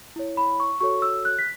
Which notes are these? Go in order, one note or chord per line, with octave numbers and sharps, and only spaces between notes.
E4 C#5
B5
C#6
F#4 A4 C#5 C#6
E6
F#6
B6